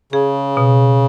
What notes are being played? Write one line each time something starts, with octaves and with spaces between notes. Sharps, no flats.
C#3 G#4
B2